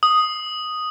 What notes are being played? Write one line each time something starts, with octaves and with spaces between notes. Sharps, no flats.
D#6